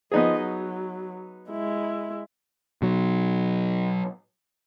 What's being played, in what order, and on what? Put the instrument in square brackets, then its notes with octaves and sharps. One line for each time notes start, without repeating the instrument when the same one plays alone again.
[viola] F3 D#5 [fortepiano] B3 D#4 G#4
[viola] F#3
G#3 E4
[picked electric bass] B2 F#3